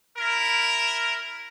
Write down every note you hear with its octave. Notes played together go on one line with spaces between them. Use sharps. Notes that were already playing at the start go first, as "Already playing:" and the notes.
E4 A#4